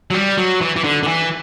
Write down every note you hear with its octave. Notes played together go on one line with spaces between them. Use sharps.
F#3
G3
F#3
E3
E3
D3
D3
E3